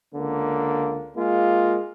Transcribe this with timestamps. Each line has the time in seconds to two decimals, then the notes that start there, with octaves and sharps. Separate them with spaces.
0.15 C#2 D3 A#3
1.17 G#3 A#3 F4